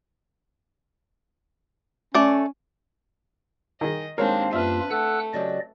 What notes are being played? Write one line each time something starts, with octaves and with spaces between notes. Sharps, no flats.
A3 C#4 D5
D#3 G#4 D#5
D#2 G#3 C4 D4 A#4 C#5 F5 G5
F#2 G3 A#3 D4 F4 B4 E5 F6
A3 A4 F#5 E6 F#6
C#3 F#3 G4 D5 D#5